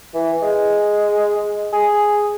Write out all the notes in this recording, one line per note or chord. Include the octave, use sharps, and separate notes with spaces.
E3
G#3
G#4